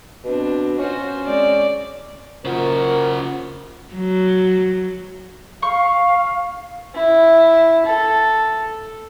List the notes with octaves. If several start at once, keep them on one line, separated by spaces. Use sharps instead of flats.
B2 C4 D4
C#4 F4 F#4 C5
G#3 C4 D5
C#3 F4 F#4 A#4 C5
F#3
F5 C#6
E4
A4